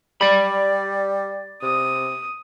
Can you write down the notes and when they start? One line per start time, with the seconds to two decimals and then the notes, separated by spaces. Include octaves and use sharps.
0.21 G3 D5 B5
1.63 C3 D#6